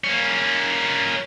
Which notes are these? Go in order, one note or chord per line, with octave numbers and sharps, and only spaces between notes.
A#3 C#4